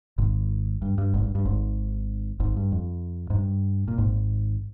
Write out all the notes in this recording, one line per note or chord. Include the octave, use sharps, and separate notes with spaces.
G#1 G#2
G2
G2
G#1 G#2
G2
G2
G#1 G#2
G#1 G#2
G2
F2
G#2
G2
A#2
G#1 G#2